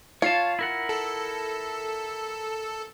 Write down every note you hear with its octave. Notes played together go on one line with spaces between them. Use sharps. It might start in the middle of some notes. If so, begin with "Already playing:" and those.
F4 C#5 F5 A5
E4 A#4 F#5
A4